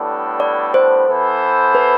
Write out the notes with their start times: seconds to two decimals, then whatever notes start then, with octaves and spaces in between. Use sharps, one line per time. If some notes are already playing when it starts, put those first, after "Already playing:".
Already playing: A2 G3 B3 D4 A4
0.40 D5
0.74 C5
1.08 E3 B3 E4 A4 C5
1.75 B4